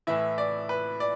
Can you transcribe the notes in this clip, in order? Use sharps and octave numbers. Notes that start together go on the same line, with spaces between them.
A2 E3 E4 E5
D5
B4
D5